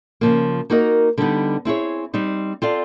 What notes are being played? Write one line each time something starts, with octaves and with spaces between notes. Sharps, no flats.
C#3 F3 A#3
A#3 D#4 F#4 A#4 D#5
D3 G3 B3 D#4
C4 E4 G#4 C#5
G3 C4 D#4
C4 F4 A4 D5 F5